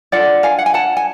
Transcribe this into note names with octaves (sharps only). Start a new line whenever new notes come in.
D4 F4 A4 D5 F#5
F5 G#5
F#5
G#5
F#5 A5
G#5